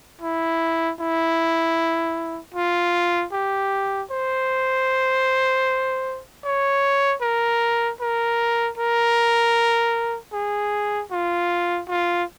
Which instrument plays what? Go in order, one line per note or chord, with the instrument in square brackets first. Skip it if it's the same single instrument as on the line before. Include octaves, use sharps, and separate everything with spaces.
[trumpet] E4
E4
F4
G4
C5
C#5
A#4
A#4
A#4
G#4
F4
F4